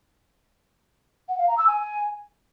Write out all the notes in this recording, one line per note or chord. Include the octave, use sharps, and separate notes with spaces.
F#5
F5
A#5
E6
G#5